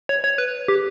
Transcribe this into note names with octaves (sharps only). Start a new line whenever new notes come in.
C#5
C#5
B4
G4